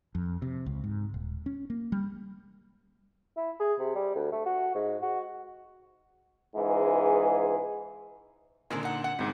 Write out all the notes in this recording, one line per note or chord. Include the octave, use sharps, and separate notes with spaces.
F2
C3
C#2
G#2
D#1
C#4
A#3
G3
E4
G#4
C3
G3
D2
A3
F#4
G#2
F#4
C#2 G#2 E3 G#3 G#4
A#2 D3 D#3 G#3 C4
D#4 F#5
F#5
G1 G#2 C3